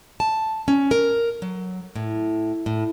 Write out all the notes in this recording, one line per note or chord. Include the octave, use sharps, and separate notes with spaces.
A5
C#4
A#4
F#3
A2
A2